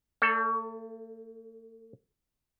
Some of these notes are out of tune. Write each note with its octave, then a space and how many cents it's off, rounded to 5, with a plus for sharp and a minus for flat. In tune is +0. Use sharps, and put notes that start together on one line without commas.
A3 +45 A4 +0 D5 -15